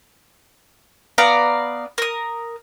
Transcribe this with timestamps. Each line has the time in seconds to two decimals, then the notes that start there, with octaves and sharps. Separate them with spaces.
1.18 B3 D5 F5 A#5
1.98 A#4 D#6